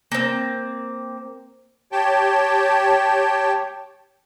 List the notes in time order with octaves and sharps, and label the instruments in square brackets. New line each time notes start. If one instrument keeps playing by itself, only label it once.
[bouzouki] A#3 C4
[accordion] G4 C#5 G5 A5